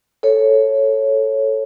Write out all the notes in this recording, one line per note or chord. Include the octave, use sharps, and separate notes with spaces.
A4 C#5